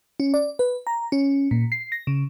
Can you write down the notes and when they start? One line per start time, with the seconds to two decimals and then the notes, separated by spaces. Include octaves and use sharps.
0.20 C#4
0.34 D5
0.59 B4
0.87 A#5
1.12 C#4
1.51 A#2
1.72 C7
1.92 A#6
2.07 C#3